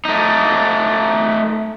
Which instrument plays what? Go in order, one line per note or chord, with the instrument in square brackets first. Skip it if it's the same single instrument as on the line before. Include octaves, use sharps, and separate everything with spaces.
[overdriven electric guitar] A3 D#4